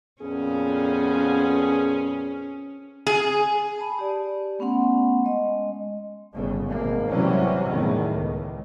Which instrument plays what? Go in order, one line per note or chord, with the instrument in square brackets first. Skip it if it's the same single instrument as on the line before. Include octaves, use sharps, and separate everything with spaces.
[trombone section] F2 A#2 B3 [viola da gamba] C#4 [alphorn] G#4
[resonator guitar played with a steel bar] G#4
[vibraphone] A5 B5
G4 D5
A3 B3 C#4 F#5 C6
G#3 D#5 C6
[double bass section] G1 C#3
G#1 B2 A#3
C3 E3 F#3 G3 C#4
E2 A2 D#3
C#2